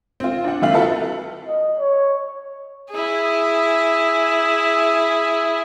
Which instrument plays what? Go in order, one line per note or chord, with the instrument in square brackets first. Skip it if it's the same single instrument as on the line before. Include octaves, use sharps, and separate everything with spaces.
[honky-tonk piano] C4 F4
D4 F#5
F#1 F4 E5 F5 F#7
E4 F#4 A4 B4 E5
[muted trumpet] D#5
C#5
[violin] E4 G#4